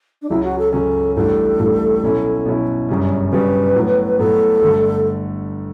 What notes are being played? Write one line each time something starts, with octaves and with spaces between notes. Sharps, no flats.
D4
C#2 C#3 F#3 C#4 E4
F#4
A4
C#2 C#3 F#3 C#4 A4
A1 A2 G3 D4 A4
A1 A2 G3 D4
B2 F#3 C#4 E4
B2 F#3 C#4 E4
G1 F#2 C#3 G3 C#4
G1 F#2 C#3 G3 C#4 B4
A2 F#3 B3
A2 F#3 B3 A4
G1 G2 D3 A3